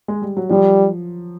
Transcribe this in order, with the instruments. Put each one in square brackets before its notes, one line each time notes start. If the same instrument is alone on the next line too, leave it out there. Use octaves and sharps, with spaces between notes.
[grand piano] G#3
G3
F#3
[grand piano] F3 [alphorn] G3